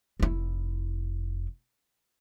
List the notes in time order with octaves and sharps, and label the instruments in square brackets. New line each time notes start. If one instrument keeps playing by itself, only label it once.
[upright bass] F1 E4